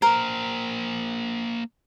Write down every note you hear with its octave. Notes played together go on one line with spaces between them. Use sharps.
A#3 A#4 C5